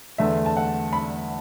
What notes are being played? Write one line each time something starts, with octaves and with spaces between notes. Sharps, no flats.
E2 D3 A3 E5
A5
F#5
B5